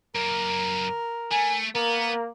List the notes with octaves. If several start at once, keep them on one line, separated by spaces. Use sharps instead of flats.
F#2 A#3 A#4
A3 G#5
A#3 B3 A#4